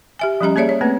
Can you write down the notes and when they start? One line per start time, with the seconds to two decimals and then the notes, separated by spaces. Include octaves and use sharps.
0.19 G4 E5 G#5
0.41 F3 G3 C#4 G4 D#5 A#5
0.56 A#3 G#4 C#5 D5 E5
0.69 C#5
0.81 A3 A#3 C4 B4